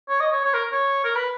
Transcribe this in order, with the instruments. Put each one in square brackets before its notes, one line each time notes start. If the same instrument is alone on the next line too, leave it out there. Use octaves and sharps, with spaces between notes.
[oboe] C#5
D#5
C#5
C#5
A#4
C#5
A#4
B4